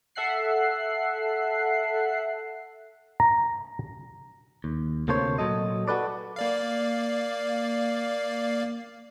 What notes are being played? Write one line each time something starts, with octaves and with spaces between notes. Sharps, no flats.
A4 E5 F#5 F#6 C7
A#5
D#2
D2 C3 A#3 A4 C5 C#5
A#2 F#3 A4 D#5
F#4 G4 A4 B4 D5
A#3 D5 F5